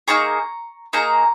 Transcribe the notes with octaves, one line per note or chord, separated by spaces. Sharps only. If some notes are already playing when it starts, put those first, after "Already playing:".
A#3 D#4 G#4 A#5 C#6
A#3 D#4 G#4 A#5 C#6